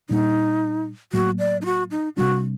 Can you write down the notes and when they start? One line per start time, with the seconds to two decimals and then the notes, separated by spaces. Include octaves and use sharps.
0.09 A#2 G3 D4 D#4
1.13 A2 F#3 A#3 F#4
1.39 D5
1.61 D#4
1.65 F#4
1.91 D#4
2.16 C3 G3 D4 F#4